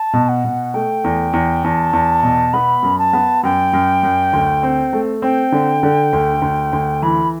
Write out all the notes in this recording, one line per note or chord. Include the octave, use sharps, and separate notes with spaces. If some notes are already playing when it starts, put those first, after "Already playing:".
Already playing: A5
B2
F#5
B2
A3 G5
E2
E2
E2 A5
E2
B2
B3 B5
F#2
A5
B3
F#2 G5
F#2
F#2
D2
C4
A3
C4 G5
D3
D3
D2
D2
D2
E3 B5